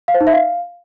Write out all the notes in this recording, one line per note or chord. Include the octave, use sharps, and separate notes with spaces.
F5
C5
D#4
E5
F5